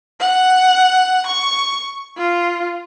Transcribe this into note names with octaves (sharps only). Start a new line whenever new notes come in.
F#5
C#6
F4